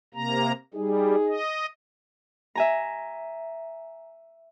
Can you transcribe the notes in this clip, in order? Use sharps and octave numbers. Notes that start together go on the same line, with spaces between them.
C3 A#3 A#5
G3 D#4 G#4
D#5
E5 G#5 A#5